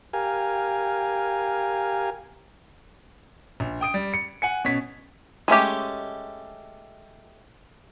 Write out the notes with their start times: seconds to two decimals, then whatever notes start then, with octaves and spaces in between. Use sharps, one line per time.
0.13 G4 A#4 F5 G#5
3.60 A#1
3.81 G5 D#6 D7
3.94 G3
4.14 C#7
4.42 F#5 G#5 C#7
4.65 B2 C#4 B6
5.48 G#3 A3 C#4 G4